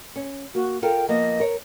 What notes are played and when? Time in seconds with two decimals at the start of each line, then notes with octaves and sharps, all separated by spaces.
0.16 C#4
0.55 A#3 F#4
0.82 F4 A4 A#4 G5
1.08 F3 A#3 B3 D#5
1.40 A#4 C#5